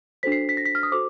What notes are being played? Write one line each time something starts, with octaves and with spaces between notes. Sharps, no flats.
D4 F#4 A4 C5 B6
C7
B6
A#6
B6
F6
D#6
F#4 A4 C5 D6